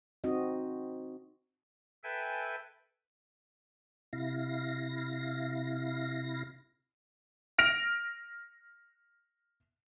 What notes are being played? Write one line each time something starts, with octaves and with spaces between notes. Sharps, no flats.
C4 D#4 F#4 D#5
A4 B4 E5 G5 G#5
C3 E4 F5 A#6
F6 A#6 D7 F7